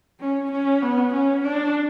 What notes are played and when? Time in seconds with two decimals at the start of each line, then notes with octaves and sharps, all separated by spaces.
0.21 C#4
0.52 C#4
0.82 B3
1.14 C#4
1.45 D4